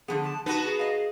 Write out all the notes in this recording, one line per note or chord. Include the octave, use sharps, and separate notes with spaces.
D3 F3 B3 G#4
A5
B3 D#4 F#4 B4 A5
G#4
D#5 F5